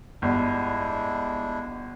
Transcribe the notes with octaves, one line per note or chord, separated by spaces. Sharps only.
G1 G#3 D4 E4